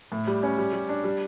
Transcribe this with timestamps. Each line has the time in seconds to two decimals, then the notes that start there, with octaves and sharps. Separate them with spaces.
0.12 A2
0.27 G3
0.43 C#4
0.58 G3
0.73 G3
0.89 D4
1.04 G3